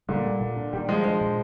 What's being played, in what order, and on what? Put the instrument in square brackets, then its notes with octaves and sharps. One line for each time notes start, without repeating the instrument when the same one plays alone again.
[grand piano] A#2 D3 [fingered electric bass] G3
[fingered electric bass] G3
A#2
D4
[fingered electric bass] A#2 [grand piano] D#3 G3
[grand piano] F3 G#3 [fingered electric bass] G3
[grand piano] F3 G#3 [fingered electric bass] D4
[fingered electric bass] A#2